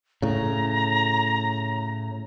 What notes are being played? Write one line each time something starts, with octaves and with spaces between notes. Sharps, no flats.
A2 C#3 A#5